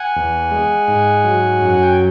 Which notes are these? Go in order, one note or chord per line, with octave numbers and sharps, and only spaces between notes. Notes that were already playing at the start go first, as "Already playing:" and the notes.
Already playing: F#5 G#5
E2
G#3
G#2
F#3
F#2
F#5
G5